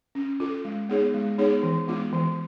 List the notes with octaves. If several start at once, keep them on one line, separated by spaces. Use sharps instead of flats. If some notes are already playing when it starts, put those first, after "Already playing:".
C#4
F4 A4
G#3
B3 D#4 G#4 C#5
G#3
B3 D#4 G#4 C#5
E3
G#3 B3 D4 F4
E3